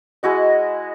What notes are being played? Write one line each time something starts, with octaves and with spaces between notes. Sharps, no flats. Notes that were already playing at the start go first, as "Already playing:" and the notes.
G#3 E4 F#4 D#5